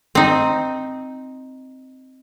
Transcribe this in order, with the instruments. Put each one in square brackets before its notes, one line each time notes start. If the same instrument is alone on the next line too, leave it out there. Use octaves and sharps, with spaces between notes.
[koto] C4 D#4